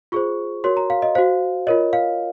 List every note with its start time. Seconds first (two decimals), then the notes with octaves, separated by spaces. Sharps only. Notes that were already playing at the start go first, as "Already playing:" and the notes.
0.12 F4 G#4 C5 C#6
0.64 F#4 A#4 C#5 C6
0.77 A#5
0.90 F5
1.02 D#5
1.15 F#4 C5 F5
1.67 F4 A#4 C#5 D#5
1.93 F5